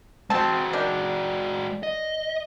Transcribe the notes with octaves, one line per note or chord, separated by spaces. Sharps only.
G#3 C4 F#4 A5
D#3 D4
D#5